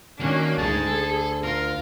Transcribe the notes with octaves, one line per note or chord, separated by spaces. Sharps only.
D#3 A#3 C#4 D4 F#4
D2 G#3 D#4 G#4 A5
A4
F4 A#4